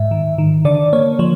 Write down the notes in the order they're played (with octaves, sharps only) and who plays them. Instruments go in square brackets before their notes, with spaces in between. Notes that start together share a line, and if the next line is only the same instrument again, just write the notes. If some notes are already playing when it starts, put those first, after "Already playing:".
Already playing: [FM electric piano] G#2 E5
D#3
D#3
D3 D5
A#3 C#5
F3 C#5